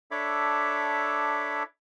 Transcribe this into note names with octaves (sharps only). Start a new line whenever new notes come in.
D4 A4 C#5 E5 B5 D6